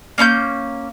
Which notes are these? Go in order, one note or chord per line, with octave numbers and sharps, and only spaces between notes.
A#3 C#4 C6 G6